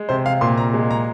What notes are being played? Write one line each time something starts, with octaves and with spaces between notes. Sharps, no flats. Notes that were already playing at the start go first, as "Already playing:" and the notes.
Already playing: G#3
C3 C5
F5
A#2 C6
A#5
G#3
A#5